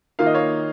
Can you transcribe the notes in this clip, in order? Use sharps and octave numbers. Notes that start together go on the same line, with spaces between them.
D#3 A#3 F4 F5
D#5
C#5 F5